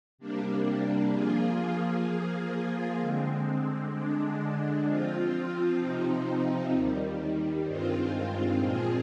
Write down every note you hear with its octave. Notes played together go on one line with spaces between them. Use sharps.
C3 G3 A#3 D4
F3 A#3 F4 G#4
F3 A#3 F4 G#4
D3 G#3 C4
D3 G#3 D4
F3 C4 F4
C3 F3 C4 D#4
D#2 D#3 G3
G2 D#3 G#3 C4 F4
A#2 F3 C4 F4 G#4